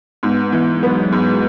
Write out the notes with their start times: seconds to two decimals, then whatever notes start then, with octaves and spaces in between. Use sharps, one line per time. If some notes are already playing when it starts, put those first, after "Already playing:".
0.23 G#2 B3
0.52 E3
0.75 G#3
0.83 F#3 B3
1.12 G#2 G#3